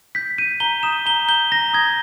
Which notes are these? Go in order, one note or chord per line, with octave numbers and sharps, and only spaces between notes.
G6 B6
G6 D#7
A#5 G7
D#6 E7
A#5 G7
G6 G7
A#5 A#6
D#6 G#6